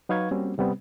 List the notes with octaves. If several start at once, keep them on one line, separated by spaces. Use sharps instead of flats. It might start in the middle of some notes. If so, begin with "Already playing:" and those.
F#3 D#4 B4 F5 C#6 G#6
G3 A#3 C4 C#4 F#4
C3 G3 B3 C4